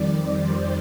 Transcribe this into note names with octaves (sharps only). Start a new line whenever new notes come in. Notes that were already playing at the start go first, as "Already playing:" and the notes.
Already playing: F2 D#3 G3 D5
C5